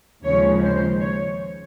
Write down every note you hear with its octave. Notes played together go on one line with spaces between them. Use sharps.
D#2 C#3 F3 G#3 C#5
C5
C#5